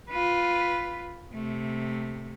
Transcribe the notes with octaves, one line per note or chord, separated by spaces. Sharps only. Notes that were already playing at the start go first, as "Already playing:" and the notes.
F4 B4
C3 A3